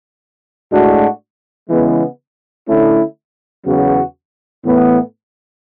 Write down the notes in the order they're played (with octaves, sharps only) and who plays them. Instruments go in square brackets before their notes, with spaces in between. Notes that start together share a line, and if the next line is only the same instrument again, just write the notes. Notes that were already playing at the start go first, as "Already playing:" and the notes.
[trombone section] A2 G#3 D4 F#4
C#3 E3 G#3 B3
D3 A3 C#4 E4
E2 C#3 F#3 B3 F#4
A2 E3 B3